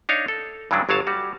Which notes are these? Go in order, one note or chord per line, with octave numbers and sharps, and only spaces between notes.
D4 D#4 C#5 F5
A4
G2 C#3 E3 F#3 G#3 D4
G1 F#3 C#5 F5 A5
G3 F#4